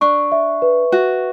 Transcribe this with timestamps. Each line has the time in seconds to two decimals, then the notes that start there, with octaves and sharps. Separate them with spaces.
0.01 D4 C#6
0.32 E5
0.62 B4
0.92 F#4 E5